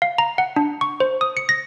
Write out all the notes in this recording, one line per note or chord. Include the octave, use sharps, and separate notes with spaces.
F5
A#5
F#5
D4
C#6
C5
D#6
C#7
A#6